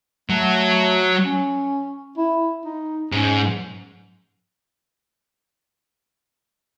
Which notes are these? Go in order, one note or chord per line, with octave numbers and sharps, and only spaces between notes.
F#3 A3
C#4
E4
D#4
G#2 C#4